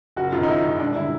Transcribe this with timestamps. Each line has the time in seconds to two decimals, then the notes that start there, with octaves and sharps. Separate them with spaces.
0.16 F#1 F#4
0.32 F#2 F4
0.37 D#3
0.43 D#4
0.48 F#1 E4
0.64 F#2 D#3
0.80 E1 D4
0.96 D3 G3 E4